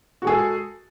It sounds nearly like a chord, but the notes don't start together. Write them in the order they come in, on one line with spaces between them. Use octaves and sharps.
F#4 G#3 G#4 A4